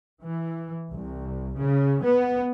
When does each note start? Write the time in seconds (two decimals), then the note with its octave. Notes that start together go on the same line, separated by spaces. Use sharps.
0.22 E3
0.91 C2
1.59 C#3
2.02 B3